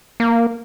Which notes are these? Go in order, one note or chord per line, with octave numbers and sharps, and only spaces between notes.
A#3